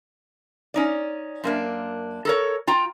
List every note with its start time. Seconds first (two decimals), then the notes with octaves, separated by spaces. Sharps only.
0.74 C#4 D#4 D5
1.44 F#2 A#3 D4
2.25 A4 A#4 C#5
2.67 F4 G5 A#5